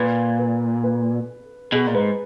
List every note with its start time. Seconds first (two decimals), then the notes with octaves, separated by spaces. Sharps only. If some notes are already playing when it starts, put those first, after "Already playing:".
Already playing: A#2 B4
0.39 B4
0.84 B4
1.72 B2 G#4
1.87 A#2
1.94 G#2 B4